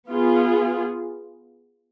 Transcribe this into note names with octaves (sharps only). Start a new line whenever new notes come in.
B3 F4 G#4